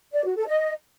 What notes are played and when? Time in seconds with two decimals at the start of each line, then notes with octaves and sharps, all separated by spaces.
0.13 D5
0.25 F#4
0.36 A4
0.47 D#5